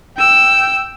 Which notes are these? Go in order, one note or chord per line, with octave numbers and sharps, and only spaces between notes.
G5 E6